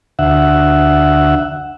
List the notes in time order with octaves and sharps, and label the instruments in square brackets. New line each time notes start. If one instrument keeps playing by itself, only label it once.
[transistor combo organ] D2 E5 F#5